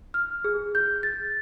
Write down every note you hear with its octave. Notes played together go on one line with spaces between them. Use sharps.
F6
G#4
G6
A6